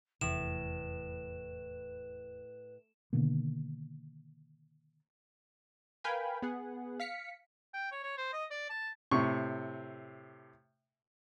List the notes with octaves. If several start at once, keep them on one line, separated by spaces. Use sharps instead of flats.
F1 E2 A2 C3 B4 E7
B2 D3 D#3 A#3
A#4 B4 F5 G5 G#5 B5
B3 G#4 F#5
F5 B6 C#7
G5
C#5
C#5
C5
D#5
D5
A5
A2 C3 C#6